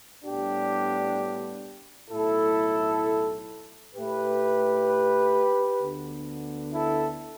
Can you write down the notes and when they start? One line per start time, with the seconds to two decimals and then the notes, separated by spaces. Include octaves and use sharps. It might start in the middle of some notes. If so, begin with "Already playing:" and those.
0.24 A2 G3 B3 D4 G4
2.10 B1 A2 A3 E4 A4
3.95 A2 A3 G4 B4
5.80 D2 D3 B3
6.73 E4 A4